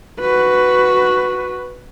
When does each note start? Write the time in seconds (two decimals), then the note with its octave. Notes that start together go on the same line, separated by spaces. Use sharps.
0.20 F#4 B4